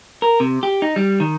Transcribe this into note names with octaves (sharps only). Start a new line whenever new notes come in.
A#4
C3
G4
D#4
G3
D#3